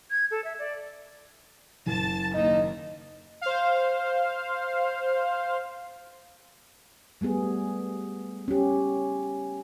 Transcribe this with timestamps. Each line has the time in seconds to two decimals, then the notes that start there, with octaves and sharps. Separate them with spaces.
0.11 G#6
0.31 A4
0.44 E5
0.59 D5
1.86 F#1 A5 A6
2.34 D#2 D#4
3.41 C5 F5
7.21 G3 A3 B3 G#4
8.48 C#4 G4